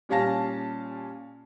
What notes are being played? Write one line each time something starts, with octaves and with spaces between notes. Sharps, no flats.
A#2 G3 C#4 F5 A5 A#6